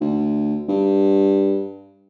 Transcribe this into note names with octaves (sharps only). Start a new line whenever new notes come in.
D2
G2